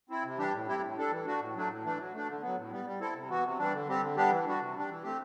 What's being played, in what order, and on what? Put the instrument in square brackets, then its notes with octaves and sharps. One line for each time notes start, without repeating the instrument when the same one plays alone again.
[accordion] C4 E4
C3
E3 G3 D4 G4
A2
G3 C4 E4 G4
A2
G3 D4 A4
E3
A3 D4 F#4
A2
F#3 A3 D4
A2
E3 A3 D4
F#3
A3 D4
D3
F#3 B3
A2
G3 B3
G3
C4 E4 A4
C3
E3 B3 F#4
C3
E3 G3 D4
D3
G3 C4 G4
D3
G3 B3 D4 G4
E3
G3 D4 F#4
C3
G3 D4
E3
A3 C4 G4